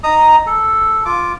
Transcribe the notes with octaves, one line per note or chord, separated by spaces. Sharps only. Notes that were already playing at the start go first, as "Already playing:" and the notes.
D#4 A#5 D#6
A4
F4 D6